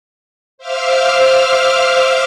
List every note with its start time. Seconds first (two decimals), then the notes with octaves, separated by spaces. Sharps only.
0.58 C5 E5 F5 D6 E6 F6